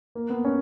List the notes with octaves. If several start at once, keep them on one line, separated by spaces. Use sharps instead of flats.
A#3
B3
C#4